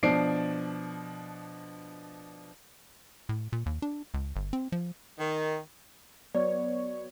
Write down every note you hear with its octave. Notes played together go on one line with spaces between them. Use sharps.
B2 F3 D4 C7 D7
A2
A#2
D#2
D4
C#2
G1
C4
F3
D#3
F#3 B3 C#5 D5